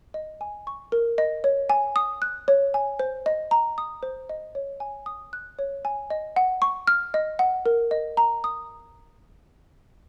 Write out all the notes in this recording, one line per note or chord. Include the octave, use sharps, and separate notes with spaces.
D#5
G#5
C#6
A#4
D#5
C#5
G#5
D#6
F#6
C#5
G#5
C5
D#5
A#5
D#6
C5
D#5
C#5
G#5
D#6
F#6
C#5
G#5
D#5
F#5
C#6
F6
D#5
F#5
A#4
D#5
A#5
D#6